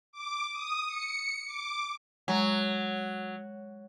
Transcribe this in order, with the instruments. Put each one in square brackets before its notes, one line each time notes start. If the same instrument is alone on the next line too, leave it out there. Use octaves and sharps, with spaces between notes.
[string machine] D6
D#6
C#7
D6
[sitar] F#3 [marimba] G#3 A#5